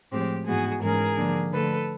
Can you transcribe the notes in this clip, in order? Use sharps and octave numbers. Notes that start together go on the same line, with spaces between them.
A2 F3 G#3 C4 G4
G#2 E3 G#3 B3 F#4 G#4
G#2 E3 G#3 C#4 G#4 A#4
D3 F3 A#3 D4
D3 F3 A3 A4 B4